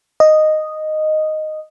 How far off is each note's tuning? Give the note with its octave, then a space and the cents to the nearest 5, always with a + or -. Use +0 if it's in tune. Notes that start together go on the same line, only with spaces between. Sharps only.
D#5 -5